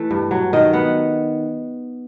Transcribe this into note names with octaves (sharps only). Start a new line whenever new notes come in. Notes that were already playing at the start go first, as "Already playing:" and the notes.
Already playing: E3 A3
G2
F#3
D#3 D#5
B3 F#5